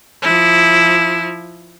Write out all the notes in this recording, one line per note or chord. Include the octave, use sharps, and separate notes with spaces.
F3 E4